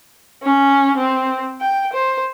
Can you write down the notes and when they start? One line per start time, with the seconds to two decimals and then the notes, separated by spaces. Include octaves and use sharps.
0.43 C#4
0.97 C4
1.60 G5
1.93 C5